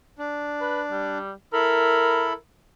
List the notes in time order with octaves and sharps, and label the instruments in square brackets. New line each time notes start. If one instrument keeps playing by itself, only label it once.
[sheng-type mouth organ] D4
[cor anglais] B4
G3
[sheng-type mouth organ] E4 A4 B5 [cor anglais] A#4